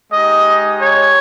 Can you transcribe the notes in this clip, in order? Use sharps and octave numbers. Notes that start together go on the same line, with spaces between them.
G#3 D#4 G4 D#5
C#5